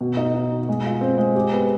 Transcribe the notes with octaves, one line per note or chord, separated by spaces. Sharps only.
B2
D#4
D#4
B2
G#3
F4
C4
G#3
G4
B3